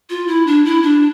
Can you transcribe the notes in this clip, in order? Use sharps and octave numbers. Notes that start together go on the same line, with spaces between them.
F4
E4
D4
E4
D4